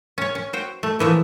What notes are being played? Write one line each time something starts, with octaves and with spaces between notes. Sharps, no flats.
C#4 C#5
C#4
F#4 C5 G5
A3
A#2 E3 F3 A3